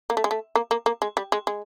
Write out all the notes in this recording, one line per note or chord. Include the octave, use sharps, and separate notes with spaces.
A#3
A3
G#3
A3
A#3
A#3
A#3
G#3
G3
G#3
G#3